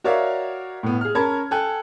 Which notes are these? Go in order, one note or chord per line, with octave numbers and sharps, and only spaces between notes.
F#4 A#4 C#5 D5 E5 F5
A2 B3
G#4 F6
C#4 A#4 A5 B5 G#6
A4 G5 G#5 F#6